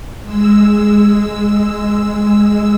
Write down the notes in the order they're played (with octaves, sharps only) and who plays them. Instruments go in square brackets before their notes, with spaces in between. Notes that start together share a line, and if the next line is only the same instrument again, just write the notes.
[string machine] G#3 E6